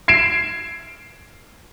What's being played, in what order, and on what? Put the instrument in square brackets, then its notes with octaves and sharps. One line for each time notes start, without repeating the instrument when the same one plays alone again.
[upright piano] G#6 C7 D7 E7